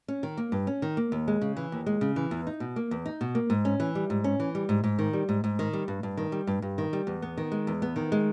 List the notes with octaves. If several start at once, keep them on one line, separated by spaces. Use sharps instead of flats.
C#4
D#3
A#3
G2
C#4
D#3
A#3
D#2
G#3
C#3
E3
D#2
G#3
C#3
E3
E2
D#4
B2
A#3
E2
D#4
B2
A#3
G#2
C#4
E3
G3
G#2
C#4
E3
G3
G#2
G#2
D#3
G3
G#2
G#2
D#3
G3
G2
G2
D#3
G3
G2
G2
D#3
G3
E2
B3
D#3
G#3
E2
B3
D#3
G#3